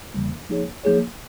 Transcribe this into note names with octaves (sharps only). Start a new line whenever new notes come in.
E2 C#3 E3 G3 A#3
F3 A#3 D#4 G#4 C#5
F3 A#3 D#4 G#4 C#5